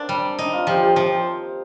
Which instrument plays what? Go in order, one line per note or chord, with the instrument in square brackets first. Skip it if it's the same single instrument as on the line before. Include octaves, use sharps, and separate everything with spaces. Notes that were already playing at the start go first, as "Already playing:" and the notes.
Already playing: [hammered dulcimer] A#3 C4 [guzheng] D4
[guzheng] G3
D#4
[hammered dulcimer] F4
[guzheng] F3 [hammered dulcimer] G4
[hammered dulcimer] G4
[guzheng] F3